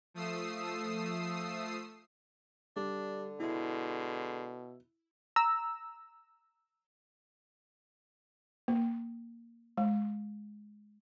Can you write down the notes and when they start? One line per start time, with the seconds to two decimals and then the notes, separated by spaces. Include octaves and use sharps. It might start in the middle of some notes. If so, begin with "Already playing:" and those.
0.14 F3 A3 D#6 E6 C7
2.76 D3 G3 D4
3.40 B2 G#3 E4
5.36 A#5 E6
8.68 A#3
9.77 G#3